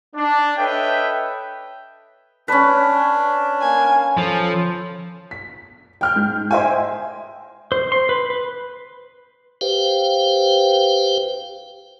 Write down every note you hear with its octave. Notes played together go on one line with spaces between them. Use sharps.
D4
A4 B4 C#5 D#5 E5 G5
C#4 D4 B4
A#3 G#5
F3 A4
B6
G5 F6 G6
G#2
C5 D#5 E5 G5 G#5
C5
C6
B4
B4
G4 B4 C5 F5 G5